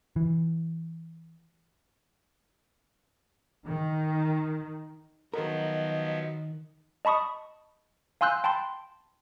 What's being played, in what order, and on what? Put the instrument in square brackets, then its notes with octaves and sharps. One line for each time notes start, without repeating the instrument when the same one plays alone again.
[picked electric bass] E3
[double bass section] D#3
[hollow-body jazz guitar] D#3 A#4 [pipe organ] F3 F#3 B3 [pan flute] D#5
[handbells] D#5 A5 B5 C#6 D#6
F5 G#5 C6 E6 F#6 G6
G5 A5 B5 C6